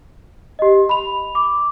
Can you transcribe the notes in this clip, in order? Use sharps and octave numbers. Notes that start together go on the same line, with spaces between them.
G4 D#5
B5 F7
D6